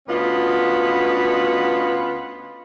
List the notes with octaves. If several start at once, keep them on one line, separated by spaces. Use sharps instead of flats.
D2 B3 C#4 F4 D#5